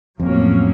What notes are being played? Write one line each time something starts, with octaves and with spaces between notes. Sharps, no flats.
F2 A2 F#3 A#3 C#4